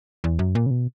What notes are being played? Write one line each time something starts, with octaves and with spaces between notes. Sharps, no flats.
E2
F#2
A#2
C#3
B2